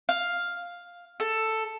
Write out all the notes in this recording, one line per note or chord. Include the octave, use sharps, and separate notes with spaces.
F5
A4